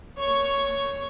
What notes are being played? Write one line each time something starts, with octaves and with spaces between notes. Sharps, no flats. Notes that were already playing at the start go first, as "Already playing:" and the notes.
C#5 C#6